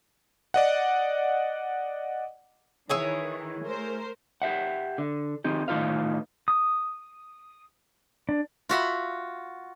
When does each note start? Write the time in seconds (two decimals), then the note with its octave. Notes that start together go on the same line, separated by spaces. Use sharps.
0.54 D5 D#5 F#5
2.89 D#3 E3 E4 G#4 C#5
3.64 A3 A#4 C5
4.42 G4 E5 F#5
4.98 D3
5.44 D#3 C4 D#4 G4
5.68 A2 D#3 D#4 F4 B4 F5
6.48 D#6
8.29 D4
8.69 F4 F#4 E5 B5